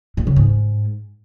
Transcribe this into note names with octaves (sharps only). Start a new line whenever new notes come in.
A#2
C#3
G#2